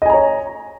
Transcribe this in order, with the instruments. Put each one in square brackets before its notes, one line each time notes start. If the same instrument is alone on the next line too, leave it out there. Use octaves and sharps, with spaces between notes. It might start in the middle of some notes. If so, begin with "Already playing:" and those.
[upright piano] D#5
G#5
A#5
C#5